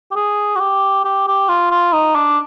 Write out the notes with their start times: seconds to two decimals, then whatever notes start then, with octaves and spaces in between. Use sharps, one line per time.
0.11 G4
0.16 G#4
0.56 F#4
0.60 G4
1.05 G4
1.27 G4
1.49 F4
1.71 F4
1.93 D#4
2.15 D4